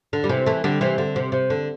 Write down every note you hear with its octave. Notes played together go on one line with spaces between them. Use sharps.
D3
G3
C3 E3
E3 A3
D3 G3
C3 E3
D3
C3
C3
D3